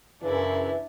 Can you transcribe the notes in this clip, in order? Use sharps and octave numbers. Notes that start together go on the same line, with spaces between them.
F#2 C#3 E3 D4 E4